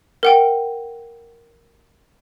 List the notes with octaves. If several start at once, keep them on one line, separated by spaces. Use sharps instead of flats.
A#4 F#5 G5